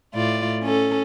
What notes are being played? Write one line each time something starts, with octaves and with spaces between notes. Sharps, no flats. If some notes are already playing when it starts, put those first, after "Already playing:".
A2 F4 D5
C#4 A4